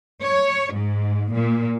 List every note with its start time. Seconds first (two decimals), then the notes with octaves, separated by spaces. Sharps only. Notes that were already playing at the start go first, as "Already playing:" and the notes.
0.22 C#5
0.73 G#2
1.32 A#2